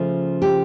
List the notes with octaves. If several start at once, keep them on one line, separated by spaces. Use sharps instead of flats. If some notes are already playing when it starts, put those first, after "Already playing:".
Already playing: C#3 F3 A3
G4